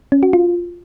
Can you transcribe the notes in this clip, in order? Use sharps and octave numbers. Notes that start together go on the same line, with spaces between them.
C#4
F#4
F4